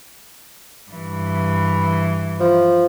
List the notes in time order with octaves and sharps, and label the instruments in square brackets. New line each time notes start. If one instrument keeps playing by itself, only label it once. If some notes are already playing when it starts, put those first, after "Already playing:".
[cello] G2 E3
[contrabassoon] F3